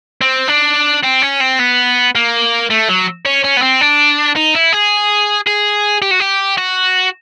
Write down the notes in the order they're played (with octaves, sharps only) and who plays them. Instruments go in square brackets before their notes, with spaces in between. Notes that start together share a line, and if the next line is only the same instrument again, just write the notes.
[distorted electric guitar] C4
D4
C4
C#4
C4
B3
A#3
A3
F#3
C#4
C#4
B3
C4
D4
D#4
E4
G#4
G#4
G4
F#4
G4
F#4